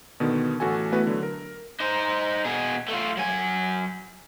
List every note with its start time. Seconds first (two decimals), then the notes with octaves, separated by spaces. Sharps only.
0.20 B2 D3 D#3 B3
0.60 A1 F#4 A4 G#5
0.92 A3 B3 E4 F#4 B4
1.07 D3 F#3
1.23 A#4
1.80 D#4 C5
2.45 B2 G#4
2.88 A3 F4
3.17 F#3 G#5